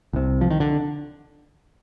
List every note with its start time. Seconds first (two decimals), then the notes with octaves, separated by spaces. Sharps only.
0.13 C2 C3
0.41 F3
0.50 D#3
0.60 D3